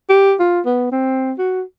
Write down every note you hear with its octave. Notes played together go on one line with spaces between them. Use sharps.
G4
F4
B3
C4
F#4